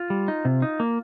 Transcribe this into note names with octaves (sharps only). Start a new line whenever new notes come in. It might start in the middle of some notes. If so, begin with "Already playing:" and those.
Already playing: F4
G3
D#4
C3
D#4
A#3